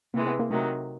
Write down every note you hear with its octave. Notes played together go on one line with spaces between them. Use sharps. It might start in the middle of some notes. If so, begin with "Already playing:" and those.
C3 E3 G#3 A#3
B3
A#3
C3 D#3 F#3 A3